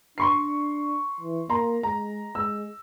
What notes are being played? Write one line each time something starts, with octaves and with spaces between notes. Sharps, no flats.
D4 C6 C#6 C7
E3
A#3 A#5 C6
G#3 A#5
G#3 E6